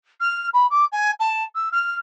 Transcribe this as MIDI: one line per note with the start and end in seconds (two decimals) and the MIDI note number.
0.20 0.48 89
0.53 0.66 83
0.70 0.85 86
0.92 1.11 80
1.19 1.43 81
1.55 1.69 88
1.72 1.97 89